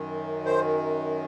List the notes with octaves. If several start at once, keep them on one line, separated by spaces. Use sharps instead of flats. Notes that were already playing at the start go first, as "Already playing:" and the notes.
Already playing: F#2 D#3
C5